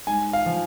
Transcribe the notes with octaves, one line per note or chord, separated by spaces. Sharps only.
G#2 G#5
F5
F3